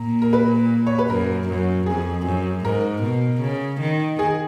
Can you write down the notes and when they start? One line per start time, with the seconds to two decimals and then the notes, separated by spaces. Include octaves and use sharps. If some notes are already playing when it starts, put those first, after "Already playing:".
Already playing: A#2 A#5
0.22 A#4
0.33 B4
0.87 C#5
0.98 B4
1.09 F#2 A#4
1.48 F#2
1.86 F2 G#4
2.26 F#2
2.65 G#2 A#4
3.02 B2
3.41 C#3
3.80 D#3
4.19 G#4